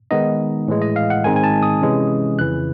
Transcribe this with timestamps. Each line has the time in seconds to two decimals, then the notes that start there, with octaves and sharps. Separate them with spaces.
0.11 D#3 G#3 B3 D#4 D#5
0.68 A2 E3 G#3
0.82 D#5
0.96 F5
1.10 F#5
1.24 G#2 D#3 G#3 C4 D#4 G#5
1.36 G#5
1.44 A5
1.63 D#6
1.82 C3 E3 G#3 C#4
2.39 F2 C#3 E3 F#6